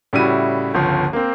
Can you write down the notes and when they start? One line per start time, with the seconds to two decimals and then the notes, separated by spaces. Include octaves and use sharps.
0.13 A2 C#3 G3 E4 F#4 D#7
0.74 G1 C#2 F3
1.13 A#3 C4